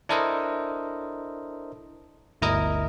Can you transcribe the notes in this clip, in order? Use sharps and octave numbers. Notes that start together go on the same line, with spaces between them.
D4 E4 A4 A#4 C5 D#5
G1 D2 E4 A#4 D#5